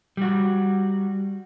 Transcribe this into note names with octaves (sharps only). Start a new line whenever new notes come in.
G3 F#4